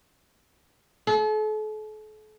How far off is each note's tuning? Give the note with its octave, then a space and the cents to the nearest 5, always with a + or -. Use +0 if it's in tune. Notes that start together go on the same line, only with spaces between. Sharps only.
A4 -40